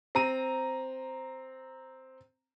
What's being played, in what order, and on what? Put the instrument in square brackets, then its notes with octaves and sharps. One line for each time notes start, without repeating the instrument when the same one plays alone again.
[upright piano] C4 A#5 D#7